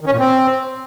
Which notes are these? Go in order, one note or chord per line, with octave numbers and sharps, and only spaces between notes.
D#3
C#4
A#2
C4